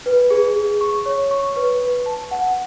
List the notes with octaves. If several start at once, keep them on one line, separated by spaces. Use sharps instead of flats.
B4
G#4
G#4
C#6
C#5
C#6
B4
B4
A5
F#5